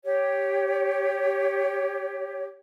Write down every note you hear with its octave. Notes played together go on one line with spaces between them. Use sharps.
G4 C#5